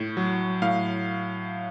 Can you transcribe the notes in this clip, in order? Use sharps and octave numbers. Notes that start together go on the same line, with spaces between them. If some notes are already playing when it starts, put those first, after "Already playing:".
Already playing: A2
F#3
A2 F5